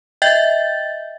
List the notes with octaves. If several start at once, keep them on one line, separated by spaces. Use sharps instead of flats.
D#5 E5 G5 G6 A6